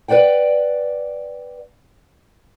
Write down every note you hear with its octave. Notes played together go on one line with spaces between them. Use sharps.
B4 C5 D5 F#5 G5